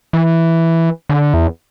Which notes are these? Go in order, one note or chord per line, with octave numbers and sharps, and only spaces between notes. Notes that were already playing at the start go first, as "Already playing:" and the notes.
E3
D3
E2